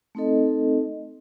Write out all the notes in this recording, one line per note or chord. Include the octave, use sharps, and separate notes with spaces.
A3 C4 D#4 A4 D#5